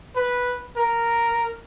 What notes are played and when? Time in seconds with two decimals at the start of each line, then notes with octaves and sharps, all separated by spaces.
0.16 B4
0.77 A#4